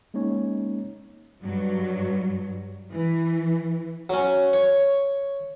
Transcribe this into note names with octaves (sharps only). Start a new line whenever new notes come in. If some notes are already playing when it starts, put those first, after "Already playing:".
G#3 A#3 C#4 D#4 C#5
G2 F#3
E3
F#3 C#4
C#5